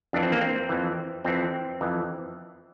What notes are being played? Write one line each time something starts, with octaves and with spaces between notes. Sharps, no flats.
F2 E3 D4
C4
A#3
C4
F2 E3
F2 E3 C4
F2 E3